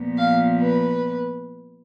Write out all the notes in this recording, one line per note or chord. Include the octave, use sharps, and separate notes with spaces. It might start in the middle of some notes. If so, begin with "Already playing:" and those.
Already playing: A#2 F3 B3
F5
B4